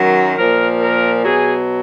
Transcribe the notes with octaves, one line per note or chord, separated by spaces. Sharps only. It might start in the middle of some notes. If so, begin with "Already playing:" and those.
Already playing: F#2 D#3 F#3
A#2 F3 A#4
A#4
B2 F#3 G#4